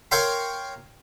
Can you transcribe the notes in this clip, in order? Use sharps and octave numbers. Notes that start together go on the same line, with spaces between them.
A#4 C#5 F5 G5 C6